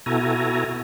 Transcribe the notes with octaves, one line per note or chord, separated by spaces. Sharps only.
B2 E4 F#4 A4 G#5 A#5